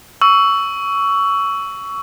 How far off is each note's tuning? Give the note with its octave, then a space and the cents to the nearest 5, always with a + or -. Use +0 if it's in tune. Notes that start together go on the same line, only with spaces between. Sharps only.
C#6 +20 E6 +0